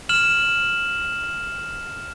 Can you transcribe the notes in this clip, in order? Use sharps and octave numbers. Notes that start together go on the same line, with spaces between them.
F6 E7 F#7